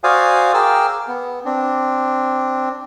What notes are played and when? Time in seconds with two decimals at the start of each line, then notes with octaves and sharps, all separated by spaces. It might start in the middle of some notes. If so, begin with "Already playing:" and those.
0.04 F#4 C5 D5 F5 G#5 D#6
0.54 G#4 A#4 G5 D6 E6 F6
1.08 B3
1.45 C4 D4